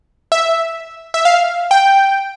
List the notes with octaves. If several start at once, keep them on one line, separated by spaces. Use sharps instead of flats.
E5
E5
F5
G5